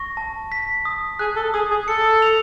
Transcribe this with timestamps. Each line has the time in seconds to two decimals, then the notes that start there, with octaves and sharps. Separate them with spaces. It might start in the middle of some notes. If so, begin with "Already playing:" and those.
Already playing: C#6 A#6
0.17 A5
0.52 B6
0.85 D#6
1.19 G#4 F#6
1.36 A4
1.54 G#4 D#6
1.71 G#4
1.88 A4 C#7
2.22 F7